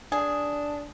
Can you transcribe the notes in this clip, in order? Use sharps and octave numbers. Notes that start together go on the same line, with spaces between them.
D4 G#4